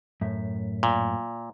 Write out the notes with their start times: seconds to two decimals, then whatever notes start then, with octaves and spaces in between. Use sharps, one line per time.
0.21 F#2 A2 E5
0.83 A#2